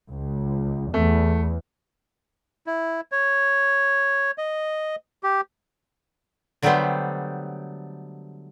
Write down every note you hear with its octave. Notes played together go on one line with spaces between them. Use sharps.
C#2
E2 A3
E4
C#5
D#5
G4
D3 F#3 G3 A3 B3 C5